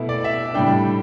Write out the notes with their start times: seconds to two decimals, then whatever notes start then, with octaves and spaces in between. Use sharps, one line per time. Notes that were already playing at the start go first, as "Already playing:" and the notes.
Already playing: B2 A3 E4
0.09 D5
0.24 E5
0.54 A2 G3 D4 G5